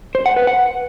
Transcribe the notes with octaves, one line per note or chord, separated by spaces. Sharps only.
C5
F#5
B4
F#5